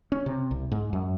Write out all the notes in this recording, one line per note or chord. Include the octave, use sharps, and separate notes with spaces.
C#4
C3
C2
G#2
F#2